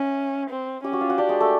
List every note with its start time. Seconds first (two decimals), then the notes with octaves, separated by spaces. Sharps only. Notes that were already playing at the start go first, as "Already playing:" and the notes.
Already playing: C#4 E5
0.50 C4
0.84 C#4 G4 G5
0.92 F#4 F#5
1.01 F4 F5
1.10 F#4 F#5
1.17 D4 G4 D5
1.29 G#3 G#4
1.40 A3 A4